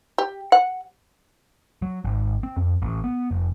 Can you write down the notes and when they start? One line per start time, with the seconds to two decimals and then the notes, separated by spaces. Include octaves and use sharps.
0.18 G4
0.52 F#5
1.82 F#3
2.05 G#1
2.43 C4
2.57 F2
2.82 A1
3.04 B3
3.31 F1